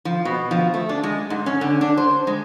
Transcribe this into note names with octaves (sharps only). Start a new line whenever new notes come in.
F3
B2
F3
A3
D4
G#3
G#2
C#4
D3
D4
C5
G#3